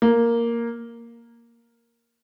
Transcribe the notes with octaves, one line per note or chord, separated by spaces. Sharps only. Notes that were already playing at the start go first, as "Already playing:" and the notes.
A#3